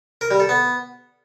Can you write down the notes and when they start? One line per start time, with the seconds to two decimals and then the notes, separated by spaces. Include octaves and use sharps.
0.21 A#4
0.31 G3
0.40 A4
0.49 B3